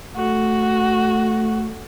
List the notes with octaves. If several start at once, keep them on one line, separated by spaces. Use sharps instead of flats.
A3 F#4